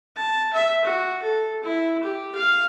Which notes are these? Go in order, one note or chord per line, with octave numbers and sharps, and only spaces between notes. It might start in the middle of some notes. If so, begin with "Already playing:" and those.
A5
E5
F#4
A4
E4
G4
F5